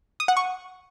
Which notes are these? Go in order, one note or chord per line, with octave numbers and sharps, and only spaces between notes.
D#6
F#5
C#6